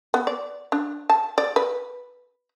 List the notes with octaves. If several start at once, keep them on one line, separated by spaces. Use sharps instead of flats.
B3
D5
D4
A5
D5
B4